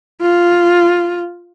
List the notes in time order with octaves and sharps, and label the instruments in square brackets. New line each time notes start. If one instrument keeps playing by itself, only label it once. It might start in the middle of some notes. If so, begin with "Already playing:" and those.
[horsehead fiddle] F4